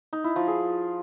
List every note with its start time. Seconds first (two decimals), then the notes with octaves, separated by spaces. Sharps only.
0.13 D#4
0.24 E4
0.36 F3
0.47 G#4